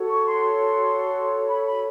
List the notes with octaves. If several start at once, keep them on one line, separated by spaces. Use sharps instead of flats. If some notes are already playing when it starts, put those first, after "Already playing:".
Already playing: F#4 A4 C#5
C#6
C6
B5
B5